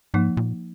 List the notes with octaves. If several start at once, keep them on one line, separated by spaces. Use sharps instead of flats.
G#2 F3 A#3 D#4
A#2